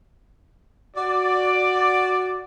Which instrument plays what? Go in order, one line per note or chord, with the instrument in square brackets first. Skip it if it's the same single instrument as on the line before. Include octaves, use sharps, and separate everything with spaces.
[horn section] F#4 D5